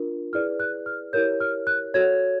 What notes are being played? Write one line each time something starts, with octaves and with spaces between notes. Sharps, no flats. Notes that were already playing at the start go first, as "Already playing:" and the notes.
Already playing: D4 F4 A#4
E4 G#4 B4 D5 F6
F#6
F6
E4 G4 A#4 C#5 G6
F6
F#6
F#4 A4 C#5 G#6